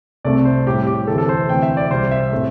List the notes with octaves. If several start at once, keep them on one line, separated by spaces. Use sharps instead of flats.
C2 C3 A3 C4 D5
C5
A2 G3 C4 G4
G4
D2 C3 E3 C4 A4
A4
C5
D2 C3 E3 A3 G5
E5
D5
C2 C3 G3 C5
E5
A2 A3 C4